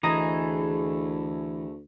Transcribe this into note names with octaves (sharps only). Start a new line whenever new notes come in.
D2 E3 A3 G#4 D#5 A#5